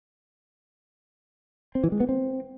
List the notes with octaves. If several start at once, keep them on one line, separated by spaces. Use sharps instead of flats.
C4
E3
G#3
B3
C4